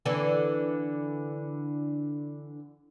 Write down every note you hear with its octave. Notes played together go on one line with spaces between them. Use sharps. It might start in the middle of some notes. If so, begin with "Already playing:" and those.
D3 E3 D4